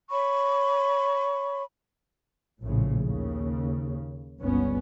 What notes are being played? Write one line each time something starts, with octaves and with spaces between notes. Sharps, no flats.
C#5 B5 C#6
A#1 A2 C#3 F3
D#2 C#3
G1 C#2 B3 C#4